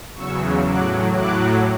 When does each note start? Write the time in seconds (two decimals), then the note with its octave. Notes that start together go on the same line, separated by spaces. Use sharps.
0.15 E2 C#3 F#3 C#6 E6
0.65 A2 F#3 D6 F#6
1.16 A2 F#3 D6 F#6